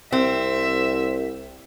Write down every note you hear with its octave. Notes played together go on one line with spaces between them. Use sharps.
C2 C4 E5